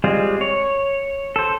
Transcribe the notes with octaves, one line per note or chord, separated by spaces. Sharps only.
G3 G#3 C4 F4
C#5
A4 C5